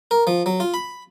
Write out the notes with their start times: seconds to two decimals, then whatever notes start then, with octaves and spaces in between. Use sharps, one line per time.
0.11 A#4
0.27 F3
0.46 F#3
0.60 F4
0.74 B5